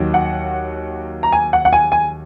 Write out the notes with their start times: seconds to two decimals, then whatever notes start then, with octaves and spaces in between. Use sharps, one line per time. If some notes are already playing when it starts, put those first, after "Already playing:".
Already playing: D#2 D#3 F#3
0.14 F#5
1.23 A#5
1.32 G#5
1.53 F#5
1.65 F#5
1.73 G#5
1.92 G#5